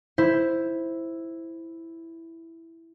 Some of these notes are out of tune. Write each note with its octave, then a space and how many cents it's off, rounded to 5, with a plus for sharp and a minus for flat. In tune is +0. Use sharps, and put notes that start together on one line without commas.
E4 +0 C5 +0